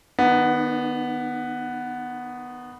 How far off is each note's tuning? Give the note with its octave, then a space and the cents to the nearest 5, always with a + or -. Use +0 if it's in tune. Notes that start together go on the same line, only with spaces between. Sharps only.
D#3 -15 B3 +0 D4 +40